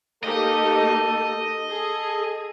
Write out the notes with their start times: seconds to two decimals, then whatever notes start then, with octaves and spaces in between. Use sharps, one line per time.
0.24 A#3 D#4 G4 A4 D#5
1.71 G#4 A4